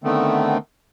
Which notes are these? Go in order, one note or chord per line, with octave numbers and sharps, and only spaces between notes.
D3 D#3 A3 B3 C4